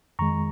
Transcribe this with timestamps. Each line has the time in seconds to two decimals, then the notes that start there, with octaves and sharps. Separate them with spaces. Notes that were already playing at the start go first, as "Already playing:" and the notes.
0.19 F2 D#3 G#3 A#5 C#6